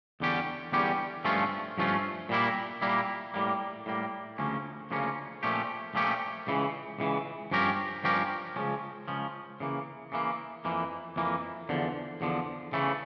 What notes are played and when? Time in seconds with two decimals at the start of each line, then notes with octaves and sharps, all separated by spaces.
0.20 E2 D3 G3 C#4 G4
0.72 E2 D3 G3 C#4 G4
1.25 G2 F3 A3 C#4 F4
1.78 G2 F3 A3 C#4 F4
2.29 A#2 G3 A#3 E4
2.82 A#2 G3 A#3 E4
3.34 A2 G3 A#3
3.86 A2 G3 A#3
4.38 D2 C#3 F3 A#3 C#4
4.91 D2 C#3 F3 A#3 C#4
5.43 A#2 F3 A3 C#4 G4
5.95 A#2 F3 A3 C#4 G4
6.47 C#2 C#3 E3
6.99 C#2 C#3 E3
7.51 G2 F3 C#4 G4 A#4
8.04 G2 F3 C#4 G4 A#4
8.56 C#2 C#3 F3 C#4
9.08 C#2 C#3 F3 C#4
9.60 C#3 E3 A#3
10.12 C#3 E3 A#3
10.65 F2 E3 A#3
11.16 F2 E3 A#3
11.69 E2 D3 F3
12.21 E2 D3 F3
12.73 C#3 E3 A3